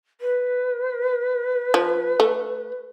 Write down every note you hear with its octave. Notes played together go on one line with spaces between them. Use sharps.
B4
F3
A3